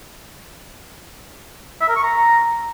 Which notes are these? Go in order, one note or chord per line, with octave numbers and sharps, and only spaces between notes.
E5
A#4
C#6
A#5